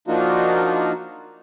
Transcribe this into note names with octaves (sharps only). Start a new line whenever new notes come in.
F3 A#3 D4 D#4 F4 F#4